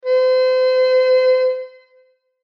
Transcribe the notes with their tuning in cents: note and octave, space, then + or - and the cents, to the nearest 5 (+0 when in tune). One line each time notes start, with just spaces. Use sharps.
C5 -35